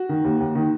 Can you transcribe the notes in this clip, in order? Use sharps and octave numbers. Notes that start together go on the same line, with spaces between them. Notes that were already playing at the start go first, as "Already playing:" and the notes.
Already playing: F#4
D#3
D#2
D#2
D#3